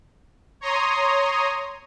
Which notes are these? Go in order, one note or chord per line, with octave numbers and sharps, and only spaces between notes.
C#5 A#5 C6 D#6